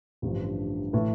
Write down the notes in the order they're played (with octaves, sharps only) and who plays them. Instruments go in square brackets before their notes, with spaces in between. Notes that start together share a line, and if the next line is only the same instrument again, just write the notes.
[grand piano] A1 G2 D3 F3
A2 E3